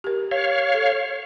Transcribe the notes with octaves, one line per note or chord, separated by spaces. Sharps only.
G4 A#4
C#5 F5
A4